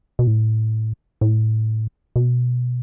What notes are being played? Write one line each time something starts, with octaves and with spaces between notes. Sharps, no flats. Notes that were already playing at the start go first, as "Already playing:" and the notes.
B2
A2
A2
B2